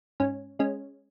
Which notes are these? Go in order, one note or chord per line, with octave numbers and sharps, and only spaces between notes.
G#2 C#4
G#3 C#4